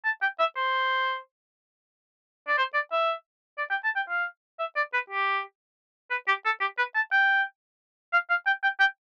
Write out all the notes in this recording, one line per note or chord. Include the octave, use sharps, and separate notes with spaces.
A5
G5
E5
C5
D5
C5
D5
E5
D5
G5
A5
G5
F5
E5
D5
B4
G4
B4
G4
A4
G4
B4
A5
G5
F5
F5
G5
G5
G5